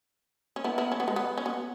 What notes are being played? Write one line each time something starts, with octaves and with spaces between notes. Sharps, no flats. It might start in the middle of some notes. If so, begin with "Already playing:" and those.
C#4
B3 E4
B3 E4
C#4
B3
G#3
B3
C#4
B3